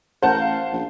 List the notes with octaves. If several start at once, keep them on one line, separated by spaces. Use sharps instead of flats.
A1 A#4 C5 F#5 A5 G6
F5
A#1